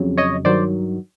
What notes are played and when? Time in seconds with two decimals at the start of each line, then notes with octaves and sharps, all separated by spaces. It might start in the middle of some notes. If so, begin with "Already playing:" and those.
Already playing: F2 C#3 F#3
0.17 C#5 D#5
0.45 G2 D#3 F#3 C5 D5